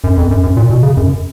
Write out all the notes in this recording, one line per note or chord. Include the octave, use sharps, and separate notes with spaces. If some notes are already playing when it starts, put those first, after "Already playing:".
F#2
F2
F#2
F#2
A#2
B2
C#3
F#2